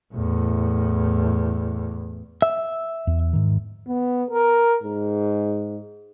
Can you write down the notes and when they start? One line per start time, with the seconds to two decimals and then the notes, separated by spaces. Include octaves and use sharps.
0.14 E2 A2
2.42 E5
3.07 E2
3.33 G#2 D#3
3.88 B3
4.31 A#4
4.83 G#2